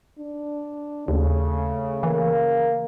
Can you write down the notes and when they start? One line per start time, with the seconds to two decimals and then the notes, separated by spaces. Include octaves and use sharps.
0.19 D4
1.08 D#2 C#3 A3
2.03 E3 A#3